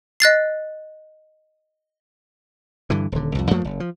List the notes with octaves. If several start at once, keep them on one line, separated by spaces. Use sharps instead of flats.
D#5 F#6 A6 C7
G2 D3 E3
D#1 D3
C2 F2
F#2 F3 A3 A#3
F#1
F3